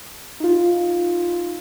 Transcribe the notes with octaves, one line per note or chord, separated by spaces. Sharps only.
D#4 F4